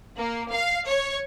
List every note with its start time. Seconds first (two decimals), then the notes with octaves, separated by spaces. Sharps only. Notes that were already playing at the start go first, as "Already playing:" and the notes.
0.19 A#3
0.53 F5
0.88 C#5